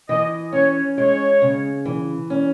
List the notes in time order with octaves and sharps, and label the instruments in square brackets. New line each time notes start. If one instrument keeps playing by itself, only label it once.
[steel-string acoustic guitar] E3 [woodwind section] D#5
[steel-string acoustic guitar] C#4 [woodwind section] C#5
[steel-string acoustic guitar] G#3 [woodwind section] C#5
[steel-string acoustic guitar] C#3
E3
C#4